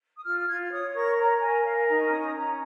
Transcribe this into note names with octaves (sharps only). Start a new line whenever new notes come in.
D#6
F4 F6
F6
F4 G#6
C#5 D#6
A#4 C#6
C#5 A#5
A#4 G#5
A#4 F5
G#5
D#4 A#5
C#6
C#4 D#6
C#6
D#6
C#4 A#5